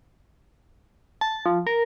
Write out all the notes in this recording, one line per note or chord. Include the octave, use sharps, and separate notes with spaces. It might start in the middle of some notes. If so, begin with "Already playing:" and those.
A5
F3
A#4